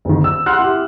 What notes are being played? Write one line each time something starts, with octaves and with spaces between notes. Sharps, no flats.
F#1 D#3
E6
F#5 C6 F6 F#6
E4 G4